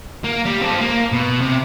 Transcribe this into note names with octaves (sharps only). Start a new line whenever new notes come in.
A#3
G3
C4 A4
A#3
B2
C3